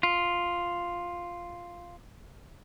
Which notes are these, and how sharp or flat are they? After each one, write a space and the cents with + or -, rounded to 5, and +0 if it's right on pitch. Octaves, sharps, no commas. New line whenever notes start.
F4 +0